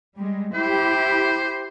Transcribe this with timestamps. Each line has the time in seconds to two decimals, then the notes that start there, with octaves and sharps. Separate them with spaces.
0.17 G3 G#3
0.54 E4 G4 C5